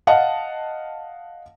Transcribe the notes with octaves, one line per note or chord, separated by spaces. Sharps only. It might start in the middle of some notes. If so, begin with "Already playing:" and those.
D#5 F5 F#5 A5